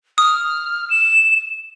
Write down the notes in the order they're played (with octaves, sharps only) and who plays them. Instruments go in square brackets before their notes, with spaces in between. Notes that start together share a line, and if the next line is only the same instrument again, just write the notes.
[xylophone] D#6 [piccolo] F6
[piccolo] E7